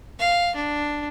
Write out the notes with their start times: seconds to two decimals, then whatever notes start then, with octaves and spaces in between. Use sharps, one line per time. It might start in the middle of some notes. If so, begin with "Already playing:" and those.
0.19 F5
0.55 D4